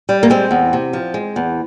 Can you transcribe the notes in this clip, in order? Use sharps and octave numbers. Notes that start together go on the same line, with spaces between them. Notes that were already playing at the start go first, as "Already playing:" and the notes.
G3
A#3
G#3 C4
E2
C3
F3
G#3
E2